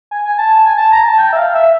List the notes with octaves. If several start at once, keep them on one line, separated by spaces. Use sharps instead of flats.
G#5
G#5
A5
G#5
A5
A#5
A5
G5
E5
F5
E5